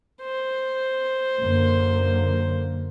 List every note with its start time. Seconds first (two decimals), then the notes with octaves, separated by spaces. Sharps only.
0.23 C5
1.40 F#2 D3 A#3